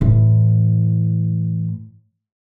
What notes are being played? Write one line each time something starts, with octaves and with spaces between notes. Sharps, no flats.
A2 E3